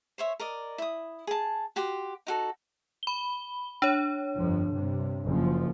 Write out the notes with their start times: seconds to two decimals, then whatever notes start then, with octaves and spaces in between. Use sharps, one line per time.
0.18 C5 C#5 E5
0.39 A#4 D5 D#5
0.78 E4 D#6
1.27 G#4 A5
1.76 F#4 G4 C6
2.27 D#4 F#4 A4
3.03 B5 G7
3.82 D4 C#5
4.36 G1 F2 F3
4.72 G2 C3
5.25 F#1 F3